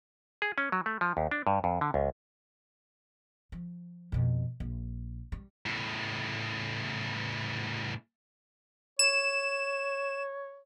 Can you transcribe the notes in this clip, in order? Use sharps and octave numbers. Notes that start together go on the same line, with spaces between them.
G#4
C#4
F#3
A3
F3
D#2
D4
G2
F2
D3
C#2
F3
F2 B2
A#1
G3
A2 C#3
C#5 E7